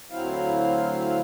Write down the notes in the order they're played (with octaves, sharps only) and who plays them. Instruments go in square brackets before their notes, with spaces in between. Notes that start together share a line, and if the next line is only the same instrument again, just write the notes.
[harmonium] D2 F#3 C4 E4 F5